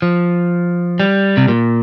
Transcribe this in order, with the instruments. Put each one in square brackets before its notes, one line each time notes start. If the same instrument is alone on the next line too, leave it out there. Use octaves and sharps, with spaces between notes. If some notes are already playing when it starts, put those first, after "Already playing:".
[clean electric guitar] F3
G3
C3
A#2